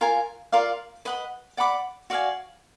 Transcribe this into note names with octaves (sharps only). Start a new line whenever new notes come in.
F4 A#4 F5 G#5
F4 A#4 D5 F5
B4 D#5 F#5 B5
D5 F#5 B5 D6
F#4 D5 F5 G#5